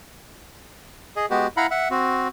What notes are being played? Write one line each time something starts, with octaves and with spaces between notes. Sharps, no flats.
G#4 D#5
G#3 B3 F#4 G4
E4 F5 F#5 A#5 B5
E5 F#5
C4 F#4